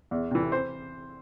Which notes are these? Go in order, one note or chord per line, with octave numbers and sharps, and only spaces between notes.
E2
C3 E3
C5